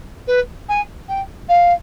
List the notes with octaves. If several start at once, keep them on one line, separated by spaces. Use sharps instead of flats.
B4
G#5
G5
F5